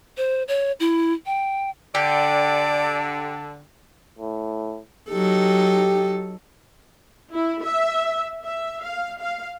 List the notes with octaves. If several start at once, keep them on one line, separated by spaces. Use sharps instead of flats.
C5
C#5
E4
G5
D3 G4 D5 A5
A2
F#3 D#4 G4 A4
E4
E5
E5
F5
F5